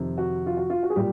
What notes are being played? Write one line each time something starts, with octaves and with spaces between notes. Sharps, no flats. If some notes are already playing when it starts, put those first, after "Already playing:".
Already playing: F2 C3 D#3
F#4
F4
F#4
F4
F#4
G#4
A#2 G3 G4